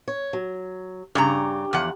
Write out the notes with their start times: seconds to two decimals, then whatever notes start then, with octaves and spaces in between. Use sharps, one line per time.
0.08 C#5
0.33 F#3
1.15 G2 C#3 G4 A#5
1.73 E2 F3 F#5